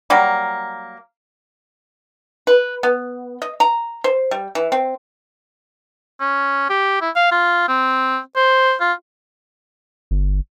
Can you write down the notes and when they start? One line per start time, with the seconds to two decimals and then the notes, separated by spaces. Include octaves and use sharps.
0.10 F#3 G3 A#3
2.47 B4
2.83 B3
3.42 D#5
3.60 A#5
4.04 C5
4.31 G3
4.55 E3
4.72 C4
6.21 C#4
6.69 G4
7.02 E4
7.15 F5
7.31 F4
7.68 C4
8.36 C5
8.80 F4
10.11 G1